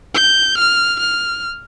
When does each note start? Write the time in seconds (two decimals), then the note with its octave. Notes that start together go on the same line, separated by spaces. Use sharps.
0.15 G6
0.58 F6
1.00 F6